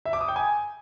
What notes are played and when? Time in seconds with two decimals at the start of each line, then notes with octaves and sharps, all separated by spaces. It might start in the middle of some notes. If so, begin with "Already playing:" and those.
0.05 E5
0.13 D6
0.21 D#6
0.28 G5
0.36 G#5